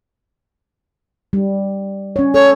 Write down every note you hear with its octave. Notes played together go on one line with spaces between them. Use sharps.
G3
C#4 C#5
A4 C#5